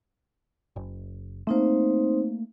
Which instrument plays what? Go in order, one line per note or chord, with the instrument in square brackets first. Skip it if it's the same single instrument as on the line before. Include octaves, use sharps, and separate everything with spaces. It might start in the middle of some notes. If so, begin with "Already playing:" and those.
[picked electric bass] F#1
[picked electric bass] A3 A#3 [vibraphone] C4 D#4 C5